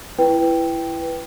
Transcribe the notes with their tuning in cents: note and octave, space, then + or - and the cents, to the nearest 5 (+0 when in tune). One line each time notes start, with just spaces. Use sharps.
E4 +20 B4 +0 G5 +0